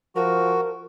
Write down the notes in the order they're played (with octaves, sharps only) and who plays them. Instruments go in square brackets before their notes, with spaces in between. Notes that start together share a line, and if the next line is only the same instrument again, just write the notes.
[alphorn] F3 [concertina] F#4 [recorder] A#4